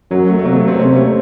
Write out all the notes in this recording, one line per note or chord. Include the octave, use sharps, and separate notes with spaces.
F#2 F#3
A3
A3
C3 F#3 A#3
A3
A3 C4
C3 A#3 C#4
A3 C4